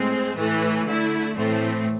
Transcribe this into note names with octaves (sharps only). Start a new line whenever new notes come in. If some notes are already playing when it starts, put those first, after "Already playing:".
Already playing: A2 G#3 C4
A2 E3 A3
D3 A3 E4
A2 E3 A3 C4